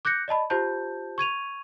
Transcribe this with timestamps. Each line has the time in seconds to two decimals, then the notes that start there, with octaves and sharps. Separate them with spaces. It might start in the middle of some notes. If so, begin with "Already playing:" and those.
0.05 D6 F#6 G6 A#6 C#7
0.28 D5 D#5 A5 B5
0.50 F4 G4 C5 A5 G6
1.18 C#6 G#6 D#7 F7